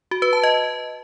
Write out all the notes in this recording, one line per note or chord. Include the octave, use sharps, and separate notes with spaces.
F#4
B4
A5
D#5